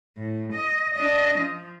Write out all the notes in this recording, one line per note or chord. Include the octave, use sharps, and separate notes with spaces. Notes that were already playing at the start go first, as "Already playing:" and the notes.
A2
D#5
D4 D#5
F3